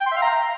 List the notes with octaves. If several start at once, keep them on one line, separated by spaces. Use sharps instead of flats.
G5
C6
E5
F5
A#5